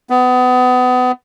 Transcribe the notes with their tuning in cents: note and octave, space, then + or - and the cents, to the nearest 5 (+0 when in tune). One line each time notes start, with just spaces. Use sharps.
B3 +30